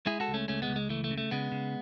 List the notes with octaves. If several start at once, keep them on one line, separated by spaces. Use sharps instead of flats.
G#3 E4 G#4
F#4 A4
C#2
A3 C#4
C#2 A3 C#4
G#3 B3
C#2
G#3
E3 A3
A3
C#3
A3
C#3 G#3 B3
C#3